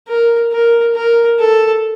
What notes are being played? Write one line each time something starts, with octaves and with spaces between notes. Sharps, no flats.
A#4
A#4
A#4
A4